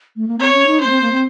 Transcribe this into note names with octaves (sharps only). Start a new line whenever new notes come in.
A3
A#3
C4 C#5
C#4
D#4
C#4 C5
A#3
C4
A#3
C4